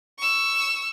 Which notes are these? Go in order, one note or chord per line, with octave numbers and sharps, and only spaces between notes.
C#6 E6